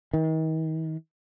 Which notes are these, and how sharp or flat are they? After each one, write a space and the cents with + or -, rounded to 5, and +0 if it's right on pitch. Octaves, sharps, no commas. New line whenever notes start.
D#3 +40